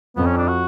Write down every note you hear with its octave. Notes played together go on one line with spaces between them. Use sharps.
F2 B3
C#4
D4
F#4